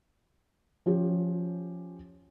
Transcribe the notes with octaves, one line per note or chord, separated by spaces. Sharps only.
F3 C#4 G4